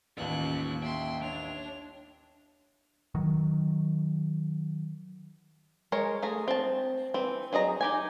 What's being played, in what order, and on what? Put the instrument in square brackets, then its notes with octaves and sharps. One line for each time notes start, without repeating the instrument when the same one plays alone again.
[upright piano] A1 D#2 [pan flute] A#3 [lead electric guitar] C#4 F4 [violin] F#6
[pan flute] A#3 [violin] E5 C6 [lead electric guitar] G5
[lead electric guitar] D4 [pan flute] C#5 [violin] F7
[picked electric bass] D#3 F#3
[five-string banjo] G#3 A#4 C#5
A3 G#4 A#5
C4 A5
E3 C4
F#3 G#4 D#5 A#5
D#4 G4 G#5